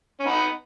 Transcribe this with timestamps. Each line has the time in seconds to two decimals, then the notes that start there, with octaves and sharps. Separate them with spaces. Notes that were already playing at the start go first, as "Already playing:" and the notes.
0.19 C#4
0.26 B3 D#4